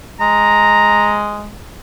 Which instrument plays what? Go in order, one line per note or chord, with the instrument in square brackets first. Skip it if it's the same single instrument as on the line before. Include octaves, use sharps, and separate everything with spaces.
[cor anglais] G#3 [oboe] A#5